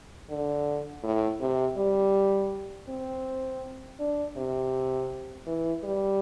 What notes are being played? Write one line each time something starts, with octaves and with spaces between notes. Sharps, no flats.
D3
A2
C3
G3
C4
D4
C3
E3
G3